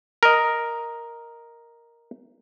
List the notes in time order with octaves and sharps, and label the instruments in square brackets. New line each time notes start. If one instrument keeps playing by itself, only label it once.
[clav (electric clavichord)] A#4 D#5